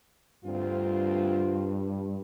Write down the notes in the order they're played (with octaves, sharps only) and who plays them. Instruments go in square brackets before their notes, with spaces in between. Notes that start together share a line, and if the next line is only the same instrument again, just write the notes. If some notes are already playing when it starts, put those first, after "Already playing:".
[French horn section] D2 C4 F4 [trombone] G2